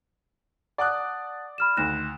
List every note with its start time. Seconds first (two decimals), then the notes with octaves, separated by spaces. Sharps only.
0.78 D5 F#5 A5 D6 D#6 F#6
1.58 B5 F6 E7
1.77 D2 D#3 F#6 A#6 E7